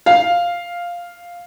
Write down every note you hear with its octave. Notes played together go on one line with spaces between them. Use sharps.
F5